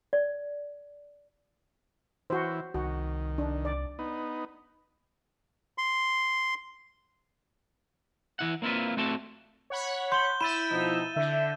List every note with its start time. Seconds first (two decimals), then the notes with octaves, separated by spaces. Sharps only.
0.13 D5
2.30 E3 F#4 C5
2.74 C2 D#3 F#4
3.38 D4
3.65 D5
3.99 B3 D#4
5.78 C6
8.39 E3 E4 F#5
8.62 A#3 C4 E4 F4 B4
8.97 A3 C4 F#4 A4 A5
9.70 C#5 F#5 B5
10.12 C6 G6 G7
10.41 E4 B5 E6 A6 D#7 E7
10.71 B2 F3 D#4
11.16 D3 E5